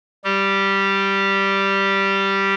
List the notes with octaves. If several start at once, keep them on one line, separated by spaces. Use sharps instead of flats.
G3 G4